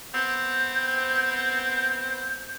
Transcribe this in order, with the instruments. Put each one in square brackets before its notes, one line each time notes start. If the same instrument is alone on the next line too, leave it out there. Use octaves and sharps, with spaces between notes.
[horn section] B3 C4 [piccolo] G6